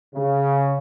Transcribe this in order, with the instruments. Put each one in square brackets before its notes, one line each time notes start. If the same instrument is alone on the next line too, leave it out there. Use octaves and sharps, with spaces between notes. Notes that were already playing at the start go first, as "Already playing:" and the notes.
[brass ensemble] C#3